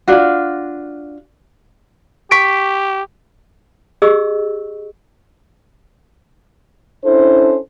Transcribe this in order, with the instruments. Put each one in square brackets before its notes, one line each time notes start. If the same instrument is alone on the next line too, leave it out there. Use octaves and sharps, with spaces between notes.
[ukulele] D4 F4 F#4
[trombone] G4 [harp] C#6 B6 D7
[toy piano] G4 G#4 D#5 C#6 E6
[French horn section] C#4 D4 E4 A4 C5